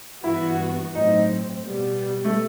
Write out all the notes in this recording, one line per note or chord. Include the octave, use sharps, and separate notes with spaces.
G2 E3 B3 E4 F#4
A2 F#3 C4 D#4
B2 G3 B3
A3